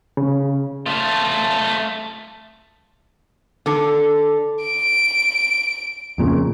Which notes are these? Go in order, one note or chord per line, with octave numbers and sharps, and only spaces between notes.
C#3
A3 F4
D3 A4
D7
F2 A#2 C#3